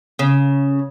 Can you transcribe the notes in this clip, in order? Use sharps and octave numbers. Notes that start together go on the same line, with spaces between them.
C#3